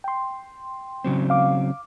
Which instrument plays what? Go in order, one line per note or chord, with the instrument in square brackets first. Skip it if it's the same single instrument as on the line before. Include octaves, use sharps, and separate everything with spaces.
[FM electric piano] G5 C6
[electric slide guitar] C#3 F#3 C4
[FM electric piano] F5 D6